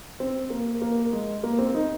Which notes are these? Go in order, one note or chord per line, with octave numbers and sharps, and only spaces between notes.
C4
A#3
A#3
G#3
A#3
C4
D#4